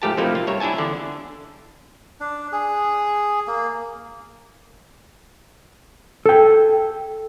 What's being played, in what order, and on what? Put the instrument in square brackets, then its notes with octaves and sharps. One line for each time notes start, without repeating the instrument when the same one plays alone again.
[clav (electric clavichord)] G#2 F3 A3 G4 A#4 A5
C3 F3 A3 A#3 D#4 E4
F4
G2 C#5 E5 A#5
D4 E4 E5 G#5 A5
E2 D3
[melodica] D4
G#4
A#3
[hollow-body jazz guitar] A4 G5